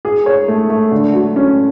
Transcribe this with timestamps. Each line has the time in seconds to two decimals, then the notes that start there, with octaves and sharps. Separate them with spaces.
0.05 G#4
0.26 C#5
0.48 A3
0.70 A3
0.91 D3
1.13 F#3
1.36 C#4